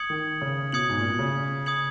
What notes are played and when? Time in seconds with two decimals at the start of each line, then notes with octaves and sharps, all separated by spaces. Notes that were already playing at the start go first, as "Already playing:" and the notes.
Already playing: D#6 G#6 C#7 F#7
0.10 D#3
0.42 C#3
0.72 B2 D#6 G#6 C#7 F#7
0.89 G#2
1.00 A#2
1.09 B2
1.19 C#3
1.66 D#6 G#6 C#7 F#7